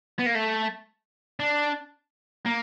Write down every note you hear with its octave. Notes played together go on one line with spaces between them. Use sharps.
B3
A#3
A3
D4
A#3